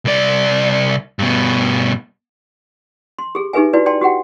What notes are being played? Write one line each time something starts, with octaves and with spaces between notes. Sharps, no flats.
C2 D5
G2 B2
C6
G4 G#4
D#4 G4 G#4 B4 E5 G#5
E4 F#4 B4 D5
D5 G5 A5 C6
F#4 G4 F#5 G5